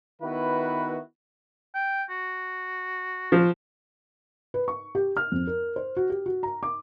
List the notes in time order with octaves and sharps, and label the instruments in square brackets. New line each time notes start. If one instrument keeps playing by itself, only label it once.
[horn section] D#3 B3 E4 F#4 B4
[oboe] G5
F#4
[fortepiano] F3
[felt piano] B4
C#6
G4
F6
F2
A#4
C5
F#4
G4
F#4
A#5
D6